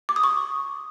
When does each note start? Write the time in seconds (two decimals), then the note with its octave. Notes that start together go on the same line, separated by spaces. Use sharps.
0.09 D6
0.16 D#6
0.24 C#6